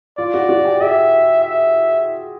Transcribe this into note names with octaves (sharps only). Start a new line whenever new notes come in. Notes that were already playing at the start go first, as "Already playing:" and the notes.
F4 D5
F#4
F#4
G4
G#4 E5
E5